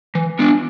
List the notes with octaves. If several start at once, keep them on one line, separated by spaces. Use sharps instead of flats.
E3
B3 D4